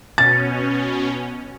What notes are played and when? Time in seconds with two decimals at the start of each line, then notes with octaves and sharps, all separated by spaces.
0.18 B2 C#4 A6